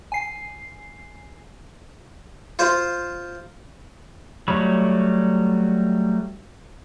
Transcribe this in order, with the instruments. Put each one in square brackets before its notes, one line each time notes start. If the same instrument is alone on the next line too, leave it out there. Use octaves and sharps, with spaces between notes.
[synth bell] G#5 C7
[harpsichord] F4 C5
[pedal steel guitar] F#3 G3 A3 C#5 B5